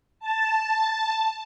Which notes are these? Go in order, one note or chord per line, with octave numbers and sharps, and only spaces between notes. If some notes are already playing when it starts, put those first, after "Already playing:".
A5